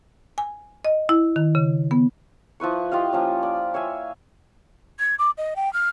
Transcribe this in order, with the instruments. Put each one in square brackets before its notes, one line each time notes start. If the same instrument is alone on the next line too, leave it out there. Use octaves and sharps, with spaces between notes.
[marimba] G#5
D#5
E4
D#3
C#3
B3
[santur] F3 E4 B4 C#6
F4 G4 D#5 F5
F3 A#3 C#4
D5
C#5 E5 F5 G#5
[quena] G#6
D6
D#5
G5
F6